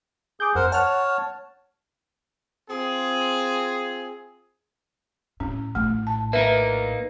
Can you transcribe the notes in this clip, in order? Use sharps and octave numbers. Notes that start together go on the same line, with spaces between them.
G#4 D6 G6
F2 A#4 C5 F#5
C#5 F#5 A5 F6
C4 F4 G#4
A2 C#4
A#1 A2 A3
A5
A#3 D#4 A#4 B4 E5